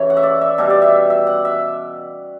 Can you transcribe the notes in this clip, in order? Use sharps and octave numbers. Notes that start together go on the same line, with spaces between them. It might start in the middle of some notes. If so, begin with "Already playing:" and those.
Already playing: C#3 E3 C#5
F#5
E5
D5
E5
B2 G3 E5
D5
E5
E5
F#5
E5